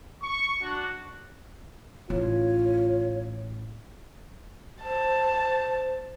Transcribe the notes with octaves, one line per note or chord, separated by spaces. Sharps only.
C#6
D4 F#4
A1 F4 C#5
C5 A5